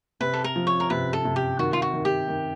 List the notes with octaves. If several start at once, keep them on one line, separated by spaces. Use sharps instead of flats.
C3 B4
A4
A#4
F3
C#5
A#4
C3 B4
A4
C3
G4
D#3 F#4
F4
F#4
D#3
G4
D#3